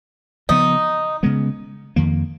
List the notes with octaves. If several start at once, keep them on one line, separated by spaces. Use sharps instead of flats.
C#3 F3 B3 D#4
C#3 G#3 B3
F2 D#3 A#3